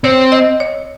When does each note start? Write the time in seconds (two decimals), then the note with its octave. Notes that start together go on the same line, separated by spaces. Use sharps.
0.04 C4 C#5
0.32 D#5
0.60 C#5